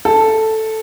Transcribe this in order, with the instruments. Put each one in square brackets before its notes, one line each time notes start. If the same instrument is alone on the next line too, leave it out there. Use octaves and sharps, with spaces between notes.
[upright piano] A4